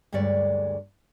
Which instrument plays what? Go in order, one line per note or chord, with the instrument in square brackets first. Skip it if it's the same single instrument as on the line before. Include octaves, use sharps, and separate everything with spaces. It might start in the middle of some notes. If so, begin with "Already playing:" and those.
[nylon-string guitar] D2 G2 G#3 C#5 D5